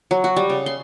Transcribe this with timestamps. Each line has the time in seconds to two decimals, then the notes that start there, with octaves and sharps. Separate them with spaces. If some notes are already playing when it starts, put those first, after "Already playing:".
0.11 F#3
0.24 F#4
0.36 G3
0.50 C#3
0.66 C6